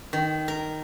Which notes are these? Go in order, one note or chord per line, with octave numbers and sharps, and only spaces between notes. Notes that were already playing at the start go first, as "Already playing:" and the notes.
D#3
A#4